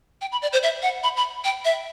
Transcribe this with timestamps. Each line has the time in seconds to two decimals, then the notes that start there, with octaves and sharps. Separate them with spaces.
0.21 G5
0.32 B5
0.42 D5
0.53 C5
0.63 E5
0.82 F#5
1.04 B5
1.17 B5
1.45 G5
1.65 E5